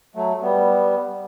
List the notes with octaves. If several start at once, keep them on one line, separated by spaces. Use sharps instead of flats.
F#3 A3
G3 B3